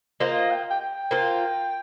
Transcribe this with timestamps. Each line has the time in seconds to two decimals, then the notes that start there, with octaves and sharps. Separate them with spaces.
0.20 A#3 F4 C5 D#5
0.50 G5
0.70 G5
0.81 G5
1.11 A#3 F4 C5